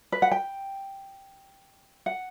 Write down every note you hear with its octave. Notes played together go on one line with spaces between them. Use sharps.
B4
F#5
G5
F#5